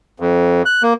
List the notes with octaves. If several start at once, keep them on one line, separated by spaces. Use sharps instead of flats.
F2
F#6
A#3